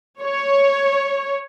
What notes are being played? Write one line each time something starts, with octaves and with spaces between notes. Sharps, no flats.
C#5